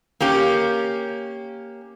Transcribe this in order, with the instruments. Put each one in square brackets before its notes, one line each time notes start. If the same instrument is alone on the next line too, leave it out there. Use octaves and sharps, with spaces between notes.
[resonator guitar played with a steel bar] A#3 C#4 G4